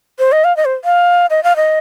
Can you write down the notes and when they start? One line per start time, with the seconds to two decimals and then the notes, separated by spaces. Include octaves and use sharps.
0.19 C5
0.32 D#5
0.44 F5
0.57 D#5
0.65 C5
0.85 F5
1.30 D#5
1.44 F5
1.56 D#5